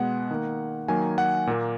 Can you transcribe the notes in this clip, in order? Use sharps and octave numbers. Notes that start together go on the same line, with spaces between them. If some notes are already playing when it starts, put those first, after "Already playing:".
Already playing: B2 G#3 B3 F#5
D#3 A#3
D#3 F#3 A#3 G#5
F#5
A#2 A#3